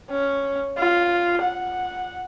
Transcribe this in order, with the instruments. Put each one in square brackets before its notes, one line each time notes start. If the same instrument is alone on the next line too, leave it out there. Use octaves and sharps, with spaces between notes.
[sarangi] C#4
F4
F#5